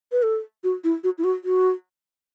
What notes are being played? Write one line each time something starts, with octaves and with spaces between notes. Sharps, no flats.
B4
A4
F#4
E4
F#4
E4
F#4
F#4